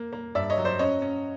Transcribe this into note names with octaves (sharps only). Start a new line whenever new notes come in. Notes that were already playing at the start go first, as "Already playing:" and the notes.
Already playing: A#3
A#3
G2 D5 E5
C#5 D#5
F#3
C5 D5
C#4 C#5 D#5
C#4